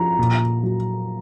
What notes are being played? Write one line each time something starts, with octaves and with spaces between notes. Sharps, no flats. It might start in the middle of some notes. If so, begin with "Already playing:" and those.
Already playing: F3 A#5
A#2
F#3